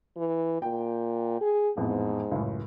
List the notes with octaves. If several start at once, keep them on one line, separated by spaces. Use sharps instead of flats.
E3
A#2 G5
G#4
A1 F2 G#2 B3
C#2 F#2 A2